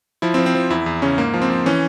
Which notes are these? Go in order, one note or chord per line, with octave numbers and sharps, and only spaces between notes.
F3 E4
C4
F3
C4
F3
E2 E4
E2
C#3 C#4
G#2 A#3
F3
C4
F3
E3 C#4